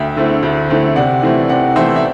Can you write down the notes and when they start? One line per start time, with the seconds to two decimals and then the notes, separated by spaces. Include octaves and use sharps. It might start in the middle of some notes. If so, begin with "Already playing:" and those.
Already playing: D2 E5 G5
0.17 D3 A3 C4 E4
0.43 D2
0.70 D3 A3 C4 E4
0.96 C3 D5 F#5
1.23 E3 A3 C4 E4
1.49 C3 D5 F#5
1.76 E3 A3 C4 E4 C5 E5
1.96 E5